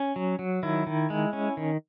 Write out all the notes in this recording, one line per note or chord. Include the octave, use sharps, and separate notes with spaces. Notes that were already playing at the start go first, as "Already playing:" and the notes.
Already playing: C#4
F#3
F#3
D#3 E4
D#3
G#3
C#4
D#3